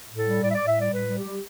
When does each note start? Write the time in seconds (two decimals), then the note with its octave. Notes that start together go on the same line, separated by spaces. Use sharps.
0.08 A2
0.17 A4
0.25 G3
0.41 A2 D5
0.49 E5
0.54 A2 D5
0.66 E5
0.74 G3 D5
0.91 A2 B4
1.08 G3
1.17 G4
1.25 G3